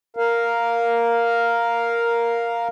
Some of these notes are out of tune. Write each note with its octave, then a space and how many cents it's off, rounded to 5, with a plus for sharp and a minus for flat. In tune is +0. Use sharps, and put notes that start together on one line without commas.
A#4 +0 F5 +0